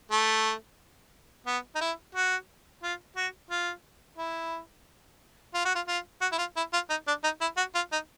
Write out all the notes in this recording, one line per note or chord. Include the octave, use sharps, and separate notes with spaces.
A3
B3
D#4
E4
F#4
F4
F#4
F4
E4
F4
F#4
F4
F4
F#4
E4
F4
E4
F4
D#4
D4
D#4
E4
F#4
F4
D#4